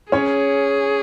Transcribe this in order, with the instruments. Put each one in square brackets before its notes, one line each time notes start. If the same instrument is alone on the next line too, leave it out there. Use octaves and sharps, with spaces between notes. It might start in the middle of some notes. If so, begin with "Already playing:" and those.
[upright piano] C#4 C#5 [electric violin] G#4